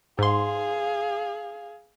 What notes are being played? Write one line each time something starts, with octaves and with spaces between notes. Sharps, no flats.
G#2 G#4 F5 C6